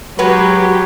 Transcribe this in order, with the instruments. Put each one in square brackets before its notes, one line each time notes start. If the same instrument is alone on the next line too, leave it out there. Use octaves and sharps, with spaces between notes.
[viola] F#3 [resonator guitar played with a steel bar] G#3 F#4 B4 [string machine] G4